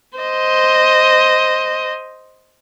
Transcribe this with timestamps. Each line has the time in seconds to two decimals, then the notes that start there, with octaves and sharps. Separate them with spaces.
0.18 C5 D#5